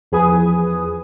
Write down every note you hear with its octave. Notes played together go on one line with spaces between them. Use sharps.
E2 F3 G#4 B4 G#5 D#6